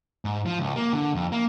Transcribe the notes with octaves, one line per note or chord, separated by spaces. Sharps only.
G#2
F3
C#2
A#3
D3
F2
A#3